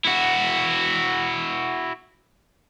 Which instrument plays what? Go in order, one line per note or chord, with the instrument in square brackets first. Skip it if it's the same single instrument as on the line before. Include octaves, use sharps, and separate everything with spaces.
[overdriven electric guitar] E4 F#4